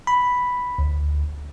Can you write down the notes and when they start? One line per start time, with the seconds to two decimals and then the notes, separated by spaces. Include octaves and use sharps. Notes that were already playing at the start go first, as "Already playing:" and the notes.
0.07 B5
0.78 D2